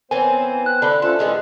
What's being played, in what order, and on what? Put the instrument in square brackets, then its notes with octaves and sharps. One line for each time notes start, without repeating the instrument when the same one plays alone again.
[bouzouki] E3 C4 [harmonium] B3 C5 [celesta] A#4 C#5 [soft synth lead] G#5
[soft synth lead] F#6
[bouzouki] D3 [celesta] A5 B5 G7
[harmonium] A3 C#4 F4 [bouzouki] A4 [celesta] C5 C6
[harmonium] A2 [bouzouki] D3 G#3 B3